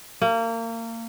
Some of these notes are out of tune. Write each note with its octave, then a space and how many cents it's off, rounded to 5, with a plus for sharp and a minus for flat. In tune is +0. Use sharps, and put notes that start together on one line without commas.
A#3 -30